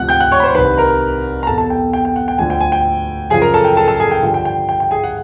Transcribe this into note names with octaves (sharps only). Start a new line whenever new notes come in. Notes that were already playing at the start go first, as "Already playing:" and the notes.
Already playing: D2 C3 F3 F#5 F#6
G5 G6
F#5 F#6
C#5 C#6
B5
C5 C6
C2 C3 D#3 B4 B5
A#4 A#5
A#5
E2 B2 A4 A5
A4 A5
G5
G5
G5
F#5
G5
D2 D3 F3 G#5
G5
G#5
G5
F#2 C#3 F3 G#4 G#5
A#4 A#5
A4 A5
G5
A4 A5
A4 A5
G#4 G#5
G5
G2 D3 F3 G5
G5
G5
G5
G5
G#4 G#5
F#5